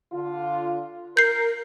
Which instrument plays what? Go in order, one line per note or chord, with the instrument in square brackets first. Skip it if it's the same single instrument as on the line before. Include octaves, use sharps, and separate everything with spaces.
[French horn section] D3 F4
[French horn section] A#4 [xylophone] G6 C7